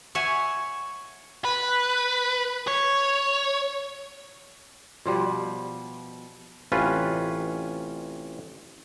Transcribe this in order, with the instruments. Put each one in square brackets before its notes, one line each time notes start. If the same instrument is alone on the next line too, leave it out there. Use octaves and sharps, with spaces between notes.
[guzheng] C#5 E5 F#5 G#5
[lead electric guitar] B4
C#5
[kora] B2 F3 G3
[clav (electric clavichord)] A1 C3 C#4 F4 B4